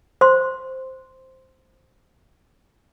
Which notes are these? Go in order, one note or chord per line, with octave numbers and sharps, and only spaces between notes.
C5 C6